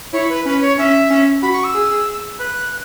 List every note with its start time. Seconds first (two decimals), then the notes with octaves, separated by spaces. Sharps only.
0.13 E4 C#5
0.29 B4
0.46 C#4 B4
0.62 C#5
0.78 C#4 E5
1.10 C#4
1.42 F#4 B5
1.53 C#6
1.64 E6
1.75 G#4
2.39 B4 F#6